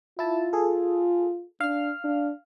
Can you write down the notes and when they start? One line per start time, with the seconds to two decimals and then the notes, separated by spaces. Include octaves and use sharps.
0.19 E4 F4 A5
0.53 G#4 A4
1.60 D4 F5 F6
2.04 D4